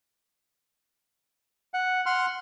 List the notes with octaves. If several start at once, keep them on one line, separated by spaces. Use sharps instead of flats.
F#5
F#5 C6 F6